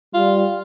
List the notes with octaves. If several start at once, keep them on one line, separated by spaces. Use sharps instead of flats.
G3 F4